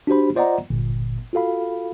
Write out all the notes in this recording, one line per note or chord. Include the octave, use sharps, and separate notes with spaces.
D4 F#4 G4 C5 B5
F4 C5 D5 D#5 F#5 A#5
G1 A#2
F4 F#4 A4 F5 B5